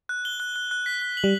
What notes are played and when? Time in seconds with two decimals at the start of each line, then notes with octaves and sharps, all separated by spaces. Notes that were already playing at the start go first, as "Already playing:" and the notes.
0.09 F#6
0.25 G7
0.40 F#6
0.56 F#6
0.71 F#6
0.86 B6
1.02 F#6
1.17 F#7
1.24 G3